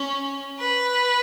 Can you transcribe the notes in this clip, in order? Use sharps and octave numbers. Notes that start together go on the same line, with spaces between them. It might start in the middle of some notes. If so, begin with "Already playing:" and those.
Already playing: C#4
B4